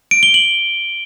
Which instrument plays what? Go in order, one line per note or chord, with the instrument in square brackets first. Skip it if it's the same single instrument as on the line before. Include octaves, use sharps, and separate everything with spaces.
[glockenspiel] D7
G7
F#7